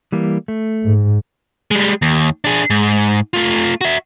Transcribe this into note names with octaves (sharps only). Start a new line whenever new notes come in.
E3 G3 A#3
A3
G#2
G3 G#3
D#2
D4 G#4
G#2
A3 F4
F#4 E5